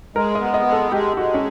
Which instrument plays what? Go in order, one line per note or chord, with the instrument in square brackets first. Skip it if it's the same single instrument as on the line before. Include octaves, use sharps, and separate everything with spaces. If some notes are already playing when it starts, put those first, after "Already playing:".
[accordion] G#3 [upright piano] A#4
[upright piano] D#5
[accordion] B3
[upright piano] D#5
[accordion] G#3
[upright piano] A4
[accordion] G#3 [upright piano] G4
[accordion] G#3 [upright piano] F#4
[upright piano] C#4